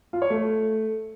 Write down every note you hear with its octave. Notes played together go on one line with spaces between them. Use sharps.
F4
C#5
A3